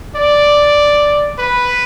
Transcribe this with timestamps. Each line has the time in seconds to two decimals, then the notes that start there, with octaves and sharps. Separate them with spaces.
0.16 D5
1.39 B4